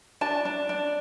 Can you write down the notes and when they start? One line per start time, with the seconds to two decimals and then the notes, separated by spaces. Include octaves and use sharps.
0.21 D4 A5
0.45 D4
0.69 D4